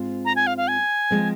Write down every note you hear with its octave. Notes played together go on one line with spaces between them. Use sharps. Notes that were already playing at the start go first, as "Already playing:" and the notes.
Already playing: G#2 G#3 C4 F4
A#5
G#5
F5
F5
G#5
F3 G#3 C4